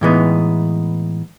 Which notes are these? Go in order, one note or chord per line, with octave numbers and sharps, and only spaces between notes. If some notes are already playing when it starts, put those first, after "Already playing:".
A2 E3 G#3 B3 D#4